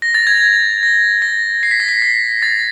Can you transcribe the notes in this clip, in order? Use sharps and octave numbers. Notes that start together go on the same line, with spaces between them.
A#6
A6
G#6
A6
A#6
A#6
C7
B6
A#6
B6
A#6
A6